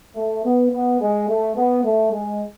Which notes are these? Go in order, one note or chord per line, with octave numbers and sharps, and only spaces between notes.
A3
B3
B3
G#3
A3
B3
A3
G#3